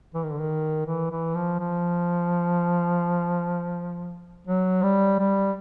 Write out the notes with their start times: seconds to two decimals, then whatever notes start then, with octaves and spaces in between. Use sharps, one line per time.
0.14 E3
0.23 D#3
0.31 D3
0.40 D#3
0.86 E3
1.11 E3
1.35 F3
1.59 F3
4.47 F#3
4.83 G3
5.19 G3